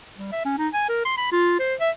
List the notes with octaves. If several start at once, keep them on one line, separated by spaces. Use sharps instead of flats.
G3
E5
C#4
D#4
G#5
A#4
C6
B5
F4
C5
E5